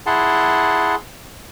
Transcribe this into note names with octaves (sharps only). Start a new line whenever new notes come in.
E4 G#4 F#5 A5 C6